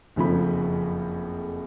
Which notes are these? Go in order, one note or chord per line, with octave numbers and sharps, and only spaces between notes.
F#1 F2 C#3 F3 A3 B5